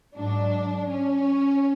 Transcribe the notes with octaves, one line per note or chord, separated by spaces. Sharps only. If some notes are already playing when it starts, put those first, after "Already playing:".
G#2 F#3 D4
C#4